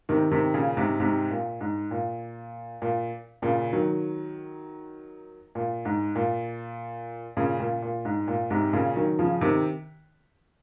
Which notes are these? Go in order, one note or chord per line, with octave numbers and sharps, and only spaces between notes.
C3 D#3
C3 D#3
A#2 C#3
G#2 C3
G#2 C3
A#2
G#2
A#2
A#2
A#2 C#3
D#3 F#3
A#2
G#2
A#2
A#2 C#3
A#2
A#2
G#2
A#2
G#2 C3
A#2 C#3
D#3 F#3
C#3 F3
C3 D#3